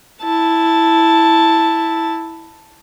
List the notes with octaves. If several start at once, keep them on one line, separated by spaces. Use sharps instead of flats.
E4 A5